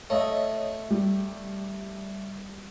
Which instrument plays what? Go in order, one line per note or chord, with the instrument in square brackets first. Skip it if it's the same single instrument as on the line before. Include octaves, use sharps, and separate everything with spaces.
[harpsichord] A3 [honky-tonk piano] C#5 D#5 E5
[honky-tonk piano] G3